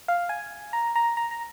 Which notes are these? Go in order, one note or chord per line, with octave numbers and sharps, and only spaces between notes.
F5
G#5
A#5
A#5
A#5
A#5